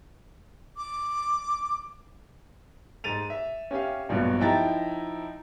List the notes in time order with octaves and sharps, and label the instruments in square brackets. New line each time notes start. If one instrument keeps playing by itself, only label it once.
[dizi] D6
[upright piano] G#2 A6 D#7 F7
E5
C#4 G4 E5 F5
A#1 G2 B2 F#3
F3 D#4 E4 G5 A#5 A6